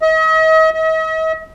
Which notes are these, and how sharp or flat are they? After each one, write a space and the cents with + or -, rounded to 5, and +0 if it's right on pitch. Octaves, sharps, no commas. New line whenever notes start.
D#5 +40
D#5 +45